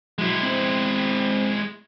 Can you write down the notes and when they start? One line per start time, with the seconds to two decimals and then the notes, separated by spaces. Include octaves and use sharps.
0.18 F#3 G#3 E4
0.43 C4